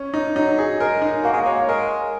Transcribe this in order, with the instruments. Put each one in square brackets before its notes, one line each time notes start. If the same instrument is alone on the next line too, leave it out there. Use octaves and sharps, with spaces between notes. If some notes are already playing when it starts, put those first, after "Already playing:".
Already playing: [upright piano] C#4
D#4
[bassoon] F#3 [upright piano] D#4
[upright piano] G#4
[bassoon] G#3 [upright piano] A#4
[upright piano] D#4
[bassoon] A#3 [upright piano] F#4
[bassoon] G#3
[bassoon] A#3 [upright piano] C#5
[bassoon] G#3 [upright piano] A#4